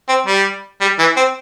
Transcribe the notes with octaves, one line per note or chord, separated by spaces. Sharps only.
C4
G3
G3
E3
C4